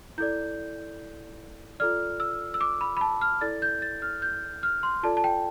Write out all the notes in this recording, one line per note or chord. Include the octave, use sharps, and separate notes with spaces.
E4 A4 D5 G6
F4 A4 D5 F6
E6
E6
D6
B5
B5
A5
F6
E4 A4 D5 A6
G6
A6
F6
G6
F6
C6
F4 A4 D5 A5
A5
G5